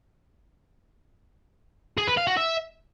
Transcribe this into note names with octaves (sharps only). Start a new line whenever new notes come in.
G#4
B4
F5
F#4
E5